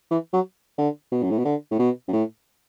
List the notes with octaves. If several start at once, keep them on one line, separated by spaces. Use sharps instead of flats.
E3
F#3
D3
B2
F#2
A2
B2
D3
A2
B2
F#2
A2